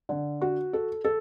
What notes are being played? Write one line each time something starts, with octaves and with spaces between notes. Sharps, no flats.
D3
F#4
A4
A4